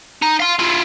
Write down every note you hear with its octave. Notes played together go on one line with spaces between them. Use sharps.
D#4
F5 C6
E4 F4